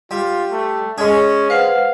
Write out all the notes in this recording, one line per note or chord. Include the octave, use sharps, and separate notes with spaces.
G3 F4
A3
G#3 C#4 G#4
B4 C5 F5 F#5